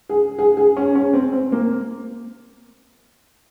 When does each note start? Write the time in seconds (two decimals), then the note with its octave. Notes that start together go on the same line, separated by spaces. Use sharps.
0.09 G#4
0.39 G#4
0.57 G#4
0.77 C#4
0.95 C#4
1.13 C4
1.32 C4
1.52 A#3